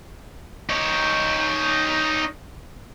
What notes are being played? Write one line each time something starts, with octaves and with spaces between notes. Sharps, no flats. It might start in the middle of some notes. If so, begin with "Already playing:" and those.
D#4 C#5